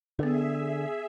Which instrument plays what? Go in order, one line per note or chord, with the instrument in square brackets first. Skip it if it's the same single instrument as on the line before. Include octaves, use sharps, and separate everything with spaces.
[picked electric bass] D3 [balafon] B3 B4 [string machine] G#4 E5